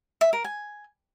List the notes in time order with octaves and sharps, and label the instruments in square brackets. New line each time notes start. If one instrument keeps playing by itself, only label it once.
[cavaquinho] E5
A#4
G#5